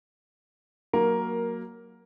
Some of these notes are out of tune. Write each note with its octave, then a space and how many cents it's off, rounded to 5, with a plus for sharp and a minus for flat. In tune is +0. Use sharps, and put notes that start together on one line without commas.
F#3 +0 A#3 +0 A#4 +10